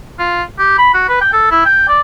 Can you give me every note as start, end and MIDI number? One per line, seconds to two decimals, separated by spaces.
0.19 0.43 65
0.58 0.77 67
0.78 0.92 83
0.94 1.07 66
1.09 1.16 71
1.21 1.30 79
1.33 1.49 69
1.51 1.61 64
1.65 1.86 79
1.88 2.01 74